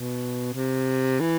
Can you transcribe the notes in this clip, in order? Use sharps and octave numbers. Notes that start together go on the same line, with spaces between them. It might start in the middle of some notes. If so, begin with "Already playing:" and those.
Already playing: B2
C3
E3